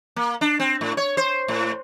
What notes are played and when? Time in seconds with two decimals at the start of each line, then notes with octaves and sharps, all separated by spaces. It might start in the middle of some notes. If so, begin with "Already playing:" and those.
0.16 A#3
0.41 D4
0.60 C4
0.81 A2
0.97 C#5
1.17 C5
1.48 A2